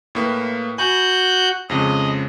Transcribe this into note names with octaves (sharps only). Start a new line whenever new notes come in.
A2 A#3 B4
F#4 G#5 B5 F#6 G6
F2 C#3 G#3 D#5